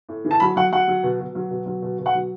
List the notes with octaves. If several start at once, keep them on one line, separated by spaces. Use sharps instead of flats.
A2
E3
A5
F#3 B5
F#3 F#5
F#3 F#5
F#3
B2
B2
F#3
B2
F#3
B2
B2
F#5
F#3